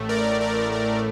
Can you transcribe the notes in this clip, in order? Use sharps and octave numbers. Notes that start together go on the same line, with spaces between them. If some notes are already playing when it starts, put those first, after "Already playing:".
Already playing: A1 A2 A3
A#4 D5
A#4 D5
A#4 D5